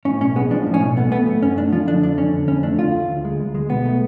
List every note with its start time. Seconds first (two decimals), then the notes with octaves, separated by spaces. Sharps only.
0.05 A2 C#4
0.21 B1 C#4
0.36 G#3 B3
0.51 F3 D4
0.67 A2
0.74 C#4
0.81 B1
0.96 A3 B3
1.11 A3 B3
1.27 A3
1.42 F#2 C#4
1.57 A3 D4
1.72 F3 F4
1.87 D3 D4
2.02 F2 D4
2.18 D3 C#4
2.33 F2
2.48 F2 C#4
2.63 A3 D4
2.79 D2 F4
2.94 D2
3.09 D2
3.25 G#3
3.39 D2
3.55 G#3
3.69 B1 B3
3.85 A3